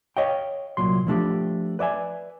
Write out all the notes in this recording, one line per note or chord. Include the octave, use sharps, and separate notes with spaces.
C#5 D#5 F5 G5
C2 A#2 F#3 C6
F3 A3 D4 G4
B4 D5 E5 G#5